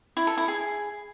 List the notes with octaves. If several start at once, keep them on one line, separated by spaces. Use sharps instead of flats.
E4
A4
E4
G#4